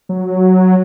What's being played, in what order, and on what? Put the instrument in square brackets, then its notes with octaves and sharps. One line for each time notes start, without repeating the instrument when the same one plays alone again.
[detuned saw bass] F#3